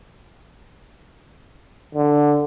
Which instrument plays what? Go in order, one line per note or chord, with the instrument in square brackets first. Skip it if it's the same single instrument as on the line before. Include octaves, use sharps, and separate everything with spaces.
[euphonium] D3